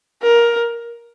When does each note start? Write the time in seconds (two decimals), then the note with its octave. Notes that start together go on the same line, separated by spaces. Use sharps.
0.22 A#4